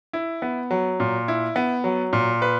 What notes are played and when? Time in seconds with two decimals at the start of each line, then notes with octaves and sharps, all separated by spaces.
0.13 E4
0.42 B3
0.71 F#3
1.00 A#2
1.28 E4
1.56 B3
1.84 F#3
2.13 A#2
2.42 B4